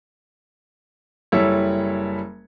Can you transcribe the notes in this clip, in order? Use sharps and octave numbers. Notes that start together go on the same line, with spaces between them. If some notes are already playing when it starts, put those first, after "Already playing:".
F#1 G3 E4 A4 C#5